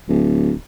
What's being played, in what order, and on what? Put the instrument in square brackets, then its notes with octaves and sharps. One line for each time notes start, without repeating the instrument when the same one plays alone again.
[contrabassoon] D1